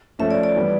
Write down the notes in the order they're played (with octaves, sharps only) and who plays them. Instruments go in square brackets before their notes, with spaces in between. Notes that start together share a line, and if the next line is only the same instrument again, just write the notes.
[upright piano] F3 A3 C#4 [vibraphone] E5
[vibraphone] D5
D5
[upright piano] E3 G3 B3